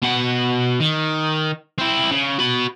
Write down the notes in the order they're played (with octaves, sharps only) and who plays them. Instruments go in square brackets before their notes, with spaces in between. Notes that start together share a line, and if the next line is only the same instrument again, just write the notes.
[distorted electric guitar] B2 F#5
D#3
C4 E4
C#3
F#4 B5